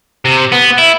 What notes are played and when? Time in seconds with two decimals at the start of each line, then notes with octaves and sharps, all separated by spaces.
0.25 C3
0.52 B3
0.78 E4